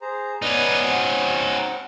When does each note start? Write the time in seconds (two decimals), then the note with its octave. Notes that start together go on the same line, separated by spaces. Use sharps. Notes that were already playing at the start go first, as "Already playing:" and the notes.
0.01 G#4 C5 A#5
0.42 B3 C#4 D#4 B4 D5
0.83 C4 F#4 F#5